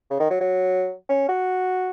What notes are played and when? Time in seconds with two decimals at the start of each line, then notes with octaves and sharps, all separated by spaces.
0.11 C#3
0.20 D#3
0.31 F#3
0.41 F#3
1.09 C#4
1.29 F#4